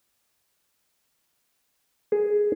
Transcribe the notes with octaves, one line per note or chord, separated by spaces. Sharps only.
G#4